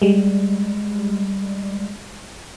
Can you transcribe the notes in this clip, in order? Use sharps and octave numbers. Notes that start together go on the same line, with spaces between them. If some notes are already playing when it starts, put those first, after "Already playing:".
G3 G#3